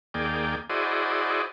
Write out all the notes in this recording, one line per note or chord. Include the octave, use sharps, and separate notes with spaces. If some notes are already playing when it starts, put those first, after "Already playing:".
D#2 A#3 G#4 D5 G5
E4 F#4 G#4 C5 D5 D#5